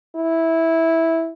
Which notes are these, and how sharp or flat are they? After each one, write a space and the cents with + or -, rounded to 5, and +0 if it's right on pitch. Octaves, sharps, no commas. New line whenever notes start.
E4 -10